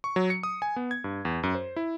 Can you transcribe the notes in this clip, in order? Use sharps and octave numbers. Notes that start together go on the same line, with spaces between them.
C#6
F#3
C#7
D#6
G#5
B3
G#6
G2
E2
F#2
C5
E4